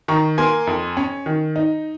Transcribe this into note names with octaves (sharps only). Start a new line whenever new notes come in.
D#3 A#5 C#6
A#3 G#5 C6
F2
C#4
D#3
D#4